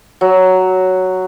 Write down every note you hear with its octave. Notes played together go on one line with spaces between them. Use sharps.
F#3